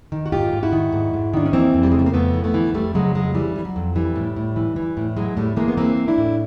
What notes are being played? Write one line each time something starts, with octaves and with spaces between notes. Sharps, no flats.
D#3
F#4
G#2 F4 G4
G#2
E4 F#4
D#3
G#2
G#2
D#3 D4
C#4
E3 A#3 C4
F2
G3
C#3 G#3
A3
A#3
F2 A3 B3
E3
A3 B3
E3
F2 G3 A3
C#3 F#3 G#3
F2 F#3 G#3
E3 G3
E3
F#3
F2
E3 G3
A2
A2
E3
E3
A2
E3 F#3 G#3
A2 G3 A3
E3 G#3 A#3
B3
E3 A#3 C4
E3
D4 E4
A2